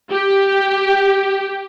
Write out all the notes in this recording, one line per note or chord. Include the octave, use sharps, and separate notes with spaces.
G4